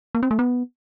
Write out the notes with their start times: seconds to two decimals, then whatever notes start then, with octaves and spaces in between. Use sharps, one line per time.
0.15 A#3
0.23 C4
0.31 A3
0.39 B3